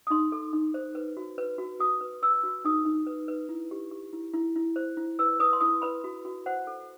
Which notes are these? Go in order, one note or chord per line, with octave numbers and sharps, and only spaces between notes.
D#6
D#4 C6
A4
D#4
C5
B4
F#4
B4
F#4
F#4 D#6
B4
B4 E6
F#4
D#4 D#6
D#4
B4
B4
E4
G4
G4
E4
E4
E4
C5
E4
B4 E6
B4 D#6
C6
E4 D#6
B4 B5
F#4
F#4
C5 F#5
A4